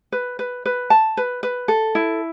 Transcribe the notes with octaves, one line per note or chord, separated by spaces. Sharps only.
B4
B4
B4
A5
B4
B4
A4
E4